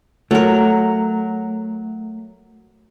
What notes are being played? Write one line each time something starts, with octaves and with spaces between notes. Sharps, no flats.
F#3 A3 A#4